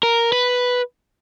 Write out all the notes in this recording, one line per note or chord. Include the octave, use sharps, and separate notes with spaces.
A#4
B4